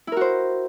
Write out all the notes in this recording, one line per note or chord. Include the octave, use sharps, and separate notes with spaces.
E4 F#4 A#4 C5